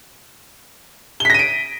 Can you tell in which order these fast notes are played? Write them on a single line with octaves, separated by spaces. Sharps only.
G7 B6 A#6 D#7 D7